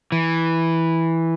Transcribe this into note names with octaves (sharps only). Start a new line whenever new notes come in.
E3